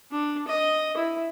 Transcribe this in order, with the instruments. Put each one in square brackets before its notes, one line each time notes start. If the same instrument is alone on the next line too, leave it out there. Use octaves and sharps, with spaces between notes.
[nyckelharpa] D4
D#5
E4